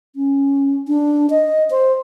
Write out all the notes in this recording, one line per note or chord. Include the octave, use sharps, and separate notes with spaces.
C#4
D4
D#5
C5